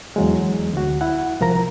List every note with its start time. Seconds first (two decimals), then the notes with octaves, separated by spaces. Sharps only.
0.16 E2 F#3 G#3
0.73 D2 F#4
1.01 E4 F#5
1.40 C2 F3 A#4 A#5